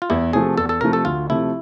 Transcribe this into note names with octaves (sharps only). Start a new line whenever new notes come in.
F4
E2 E4
C3 F3 A3 G#4
E2 A4
A4
C3 F3 A3 A#4
A4
D2 F4
C3 F3 A3 E4